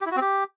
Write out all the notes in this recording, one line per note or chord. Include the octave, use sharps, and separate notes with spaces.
G4
E4
F#4
C4
G4